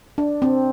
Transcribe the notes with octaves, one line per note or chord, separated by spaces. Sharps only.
D4
C4